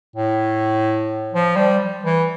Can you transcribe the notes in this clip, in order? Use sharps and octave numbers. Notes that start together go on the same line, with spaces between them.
A2
F3
G3
E3